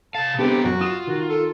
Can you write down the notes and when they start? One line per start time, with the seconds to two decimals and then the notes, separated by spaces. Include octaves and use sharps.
0.15 C3 F5 A5
0.39 G#3 B3 C4 D4 G4 A4
0.64 F#2 F#4
0.81 F4 D#6 E7
1.07 D#3 F#4
1.29 A4